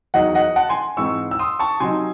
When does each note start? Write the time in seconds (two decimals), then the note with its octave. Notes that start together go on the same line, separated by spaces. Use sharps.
0.14 E2 D#3 F#3 D#5 F#5
0.35 D#5 F#5
0.56 F#5 A5
0.69 G#5 C6
0.97 G#2 E3 C4 D#4 C#6 E6
1.31 E6
1.39 C6 D#6
1.59 A5 C#6
1.80 C3 F#3 C4 D#4 G#5 C6